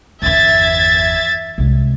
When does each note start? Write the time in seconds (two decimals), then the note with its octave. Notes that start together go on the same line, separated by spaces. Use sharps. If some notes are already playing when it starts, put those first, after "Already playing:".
0.22 G1 E2 E5 G#6 A6
1.58 C2 G#3